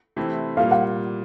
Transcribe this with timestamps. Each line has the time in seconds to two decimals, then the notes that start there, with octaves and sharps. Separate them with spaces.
0.16 C3 E3 A3 C4 E4
0.57 A#2 G3 A#3 F5
0.71 F#5